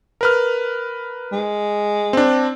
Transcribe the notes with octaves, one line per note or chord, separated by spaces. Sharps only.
A#4 B4 F6
G#3
C4 D4